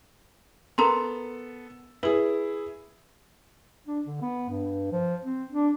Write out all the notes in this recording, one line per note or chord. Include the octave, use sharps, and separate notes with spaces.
B3 A4 A#4 A#5 C6
E4 G#4 B4
D4
D3
B3
G2
F3
C4
D4